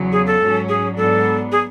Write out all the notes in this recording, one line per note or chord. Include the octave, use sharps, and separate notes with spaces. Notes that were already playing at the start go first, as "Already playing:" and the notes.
Already playing: E2 C#3 F#3
G#4
A4
G#2 F#3 C#4
G#4
G#2 F#3 B3 D4 A4
G#4